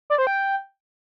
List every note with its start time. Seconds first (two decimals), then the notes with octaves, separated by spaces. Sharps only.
0.10 D5
0.18 C5
0.27 G5